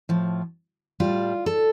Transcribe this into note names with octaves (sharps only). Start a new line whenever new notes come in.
A2 F3
A2 G3 F4
A4